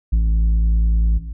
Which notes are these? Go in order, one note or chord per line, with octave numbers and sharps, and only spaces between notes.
A1